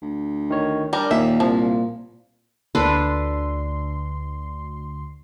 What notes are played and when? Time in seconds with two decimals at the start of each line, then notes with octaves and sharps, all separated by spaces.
0.02 D2
0.50 D#3 C#5
0.93 G3 D4 A#4
1.11 D#2 A#2 A#3 E5
1.40 C2 F3
2.75 D2 D4 A4 B4 C6